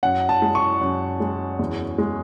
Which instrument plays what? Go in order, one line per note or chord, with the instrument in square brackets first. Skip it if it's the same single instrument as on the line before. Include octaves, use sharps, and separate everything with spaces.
[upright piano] F#2 F#5
A5
G#3
C#6
F#2
G#3
E2
G#3